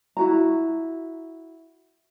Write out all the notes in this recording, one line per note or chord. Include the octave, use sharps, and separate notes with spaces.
E4 F#4 A#5